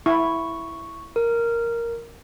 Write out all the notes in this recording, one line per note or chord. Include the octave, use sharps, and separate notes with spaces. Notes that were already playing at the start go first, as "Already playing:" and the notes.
E4 C#6
A#4